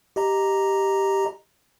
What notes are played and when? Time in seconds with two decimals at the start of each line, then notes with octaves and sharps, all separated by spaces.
0.16 G4 D#5 A#5